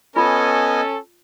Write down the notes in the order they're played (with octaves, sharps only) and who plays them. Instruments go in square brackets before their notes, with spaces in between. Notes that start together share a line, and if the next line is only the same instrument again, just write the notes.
[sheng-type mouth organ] B3 D#5 G#5 [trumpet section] C#4 A4 [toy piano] F4